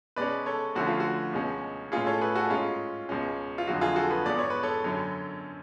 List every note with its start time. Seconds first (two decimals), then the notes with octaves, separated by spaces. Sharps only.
0.16 B2 G#3 C#4 B4 D5
0.46 A4 C#5
0.75 D2 D3 F3 A3 C#4 F#4
0.88 F4
1.00 F#4
1.33 C#2 B2 G#3 C#4
1.92 A2 G#3 C#4 F4 G#4
2.07 A4 C#5
2.21 G#4 B4
2.35 F#4 A4
2.50 G#2 G#3 C#4 F4
3.09 C#2 B2 G#3 C#4
3.58 F4
3.67 F2 D3 F#3 F#4
3.81 F4 G#4
3.96 F#4 A4
4.11 G#4 B4
4.26 G#2 G#3 B3 D5
4.39 C#5
4.50 B4
4.63 A4 C#5
4.84 F#2 D3 F#3 C#4